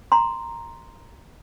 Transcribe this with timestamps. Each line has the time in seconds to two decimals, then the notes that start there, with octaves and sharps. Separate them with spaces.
0.12 A#5 C6